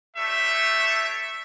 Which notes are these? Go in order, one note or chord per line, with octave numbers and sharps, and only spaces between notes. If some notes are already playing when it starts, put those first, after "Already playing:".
G3 A3 D4 C#5 E5